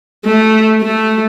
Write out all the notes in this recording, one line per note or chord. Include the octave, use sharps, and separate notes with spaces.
A3
A3